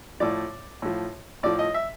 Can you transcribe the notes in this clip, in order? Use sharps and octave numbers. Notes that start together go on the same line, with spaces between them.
A2 F3 D5
A2 F3
A2 F3 D5
D#5
E5